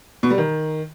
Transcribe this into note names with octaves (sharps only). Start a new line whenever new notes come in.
B2
G3
D#3